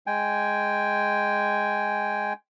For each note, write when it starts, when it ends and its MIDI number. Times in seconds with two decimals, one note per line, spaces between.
0.07 2.33 56
0.07 2.33 79
0.07 2.33 80